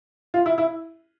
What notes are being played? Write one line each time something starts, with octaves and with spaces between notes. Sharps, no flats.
F4
E4
E4